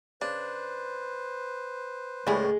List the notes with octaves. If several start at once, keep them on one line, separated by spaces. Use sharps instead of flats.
C#3 D4 B4 C5
C#2 A2 G3 G#3 E4 G#4